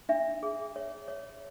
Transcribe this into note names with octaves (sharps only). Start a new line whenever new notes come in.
D4 E5
G#4
C#5
C#5